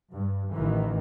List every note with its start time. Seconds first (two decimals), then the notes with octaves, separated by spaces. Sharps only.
0.14 G2
0.52 A1 A2 D#3 E3